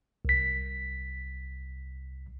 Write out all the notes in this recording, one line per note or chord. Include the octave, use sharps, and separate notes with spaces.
C2 B6